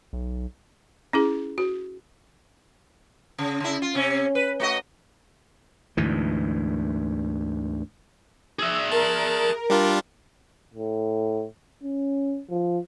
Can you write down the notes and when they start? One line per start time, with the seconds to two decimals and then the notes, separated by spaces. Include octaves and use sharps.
0.13 B1
1.13 C#4 E4 G#4
1.58 F#4
3.38 C#3
3.60 C#3 E4
3.82 F4
3.95 C3 C#4
4.35 B4
4.60 A3 F#4 D#5
5.97 D2 G#2 E3
8.59 G#4 E5 E6
8.92 A#4 A5
9.70 G3 D4 F4
10.74 A2
11.83 C#4
12.50 F3